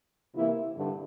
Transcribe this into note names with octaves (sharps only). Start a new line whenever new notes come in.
C3 E3 A#3 E4
G2 D3